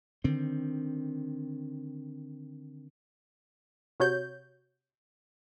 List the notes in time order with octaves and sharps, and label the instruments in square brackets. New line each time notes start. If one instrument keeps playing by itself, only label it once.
[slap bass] D3 D#3 C4
[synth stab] C3 F#4 C#5 G6